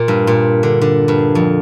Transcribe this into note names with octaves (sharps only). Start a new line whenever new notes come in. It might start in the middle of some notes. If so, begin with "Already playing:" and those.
Already playing: A#2
G2
A#2
D3
D3
G2
F2